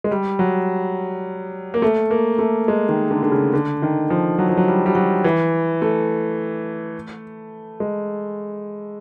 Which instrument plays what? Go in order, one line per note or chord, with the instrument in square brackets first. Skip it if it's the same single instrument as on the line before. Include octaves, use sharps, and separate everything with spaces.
[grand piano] G#3
G3
F#3
A#3
A3
A#3
A3
G#3
D#3
D3
D3
C#3
D3
D#3
F3
F#3
F3
F#3
G3
G3
F#3
E3
A3
G#3